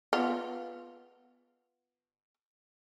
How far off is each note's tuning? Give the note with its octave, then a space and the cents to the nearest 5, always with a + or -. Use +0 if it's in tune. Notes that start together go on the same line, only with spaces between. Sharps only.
B3 +0 F4 +0